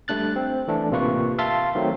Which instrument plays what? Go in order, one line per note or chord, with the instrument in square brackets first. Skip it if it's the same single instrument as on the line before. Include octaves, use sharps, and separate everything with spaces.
[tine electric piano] G3 A3 D4 F#6 A6
C4
E3 A3 D4
A1 C3 A#3 F4 B4 C#6
E5 F5 A5 C6 A6
D#3 F#3 A3 C4